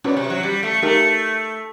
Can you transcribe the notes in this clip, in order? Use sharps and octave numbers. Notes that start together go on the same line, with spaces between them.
B2 C#4 F#4 B4 D5
C3
F#3
G3
A3
A3 D#4 G4 A#4